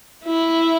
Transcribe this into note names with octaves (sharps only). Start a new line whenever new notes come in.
E4